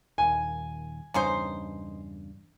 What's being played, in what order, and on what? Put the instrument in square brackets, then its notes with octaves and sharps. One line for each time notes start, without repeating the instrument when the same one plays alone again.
[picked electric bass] D#1 D#2 [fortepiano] G#5
[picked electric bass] E2 G2 C#3 [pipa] C#4 D#4 C5